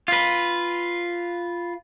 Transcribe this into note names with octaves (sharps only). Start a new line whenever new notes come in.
F4 B4